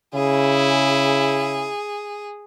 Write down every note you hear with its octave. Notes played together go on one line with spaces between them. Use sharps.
C#3 E4 G#4